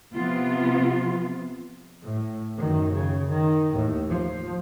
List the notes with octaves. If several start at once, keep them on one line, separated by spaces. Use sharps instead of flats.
C3 F3 B3 F4
A2
F#2 D#3
C#3
D#3
D#2 A2
F3